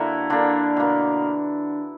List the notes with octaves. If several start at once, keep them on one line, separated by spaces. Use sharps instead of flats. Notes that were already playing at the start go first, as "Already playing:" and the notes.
Already playing: D3 A#3 E4 F#4
D3 A#3 D4
B2 A#3